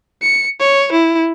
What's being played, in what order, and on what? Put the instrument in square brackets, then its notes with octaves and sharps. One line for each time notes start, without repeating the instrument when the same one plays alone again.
[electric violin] C#7
C#5
E4